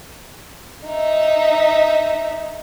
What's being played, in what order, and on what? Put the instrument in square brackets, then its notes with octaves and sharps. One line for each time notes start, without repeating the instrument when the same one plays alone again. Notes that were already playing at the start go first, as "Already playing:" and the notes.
[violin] D#4 E5